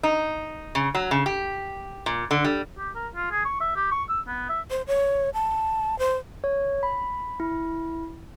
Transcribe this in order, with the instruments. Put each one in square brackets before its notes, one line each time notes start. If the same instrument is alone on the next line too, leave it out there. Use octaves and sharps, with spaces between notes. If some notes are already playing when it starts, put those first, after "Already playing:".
[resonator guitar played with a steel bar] D#4
C#3
F#3
C#3
G4
A#2
D3
G3
[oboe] G4
A#4
F4
G#4
C#6
E5
G4
C#6
E6
B3
E5
[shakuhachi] C5
C#5
A5
C5
[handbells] C#5
B5
E4